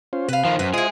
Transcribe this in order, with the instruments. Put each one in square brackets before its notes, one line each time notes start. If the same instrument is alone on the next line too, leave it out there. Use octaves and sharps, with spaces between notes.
[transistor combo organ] C#4 F4 C5
[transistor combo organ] C3 [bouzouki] B4 F5
[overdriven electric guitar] D#3 F3 [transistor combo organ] C5
[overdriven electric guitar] F#2 [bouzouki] B4 [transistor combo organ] C5
[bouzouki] G#3 E4 [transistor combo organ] F4 C5 D#5 [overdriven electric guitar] G#4